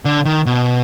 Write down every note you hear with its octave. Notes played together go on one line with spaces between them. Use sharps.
D3
D#3
B2